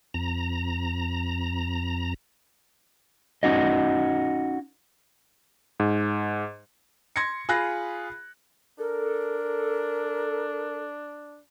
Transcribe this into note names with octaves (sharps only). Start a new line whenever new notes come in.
F2 A#5
C#4 D#4 F#4 D#5
G#2
C6 G#6 A#6 C#7
F4 G#4 B5 F#6 A#6
D4 A4 A#4